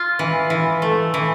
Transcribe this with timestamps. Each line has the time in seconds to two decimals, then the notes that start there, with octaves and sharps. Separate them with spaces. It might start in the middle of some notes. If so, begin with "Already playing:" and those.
Already playing: F4
0.19 E3
0.50 E3
0.82 A3
1.14 E3